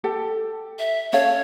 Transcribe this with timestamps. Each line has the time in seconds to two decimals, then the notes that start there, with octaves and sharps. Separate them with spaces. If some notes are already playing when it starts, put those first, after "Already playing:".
0.04 G4 A4 G5
0.79 E5
1.13 C#4 A4 C#5 F5